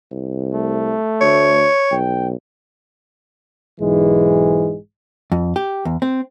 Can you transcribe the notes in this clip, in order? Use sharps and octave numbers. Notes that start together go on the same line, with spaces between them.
C2
A3
D2 C#5
B1 G5
B1 G#2 E3 G#3
F2
G4
E2
C4